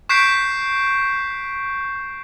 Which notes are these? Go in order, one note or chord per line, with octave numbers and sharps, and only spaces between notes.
C#6 F#6 G6 B6 C7 D7